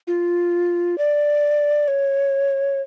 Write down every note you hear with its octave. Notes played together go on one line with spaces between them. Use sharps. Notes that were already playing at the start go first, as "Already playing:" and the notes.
F4
D5
C#5